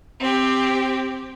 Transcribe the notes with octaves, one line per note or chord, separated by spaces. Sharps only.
C4 G4